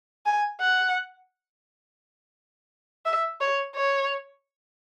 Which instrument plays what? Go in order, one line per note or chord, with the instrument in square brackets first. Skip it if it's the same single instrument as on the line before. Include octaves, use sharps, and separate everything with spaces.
[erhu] G#5
F#5
E5
C#5
C#5